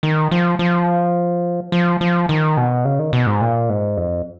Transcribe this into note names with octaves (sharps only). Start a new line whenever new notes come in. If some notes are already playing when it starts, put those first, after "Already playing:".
D#3
F3
F3
F3
F3
D#3
B2
C#3
D#3
B2
G#2
A#2
G#2
F2